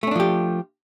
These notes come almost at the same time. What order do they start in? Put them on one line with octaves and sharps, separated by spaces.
A3 C#4 D4 F3 G4